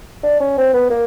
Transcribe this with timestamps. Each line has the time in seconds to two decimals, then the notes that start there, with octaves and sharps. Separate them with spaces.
0.23 D4
0.40 C#4
0.58 C4
0.74 B3
0.90 A#3